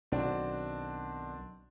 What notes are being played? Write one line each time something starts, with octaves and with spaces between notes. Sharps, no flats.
B1 D#3 C4 D4 F#4